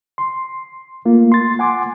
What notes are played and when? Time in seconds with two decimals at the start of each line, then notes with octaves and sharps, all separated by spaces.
0.18 C6
1.05 A3 A#3 F4
1.32 C6 A6
1.59 F#5 G#5 C6 D6